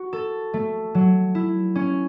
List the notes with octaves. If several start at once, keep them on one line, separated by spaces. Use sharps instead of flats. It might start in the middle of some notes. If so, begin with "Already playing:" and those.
Already playing: F#4
A4
A3
F#3
E4
C#4